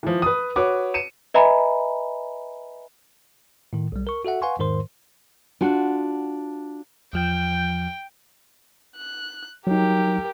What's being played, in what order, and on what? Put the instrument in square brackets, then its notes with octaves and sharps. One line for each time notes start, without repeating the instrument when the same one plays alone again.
[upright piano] E3 F3
B4 D#6
F#4 B4 C#5 D6
C#7 D#7 E7
[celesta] B4 D#5 E5 G#5 A#5 B5
[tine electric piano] A2 D#3
B1 G3
A#4 C#6
F#4 A4 E5 F#5
B4 F5 F#5 G#5 C6 C#6
E2 G#2 D#3 A#4 C5 C6
[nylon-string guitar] D4 F4 F#4
[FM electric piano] E2 F3 G6 [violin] G5
[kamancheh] F#6
[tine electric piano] F#3 D#4 [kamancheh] G4 A#4